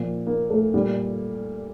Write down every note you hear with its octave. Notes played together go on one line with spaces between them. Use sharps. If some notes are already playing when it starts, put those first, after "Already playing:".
Already playing: A#2 F3
A#3
A3
A#2 G3